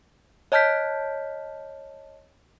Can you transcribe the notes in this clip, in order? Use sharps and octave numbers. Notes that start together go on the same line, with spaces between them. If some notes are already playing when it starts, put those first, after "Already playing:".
C#5 D#5 A5 F6 G6 B6